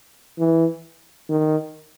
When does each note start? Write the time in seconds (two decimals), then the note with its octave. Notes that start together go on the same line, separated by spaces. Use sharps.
0.38 E3
1.29 D#3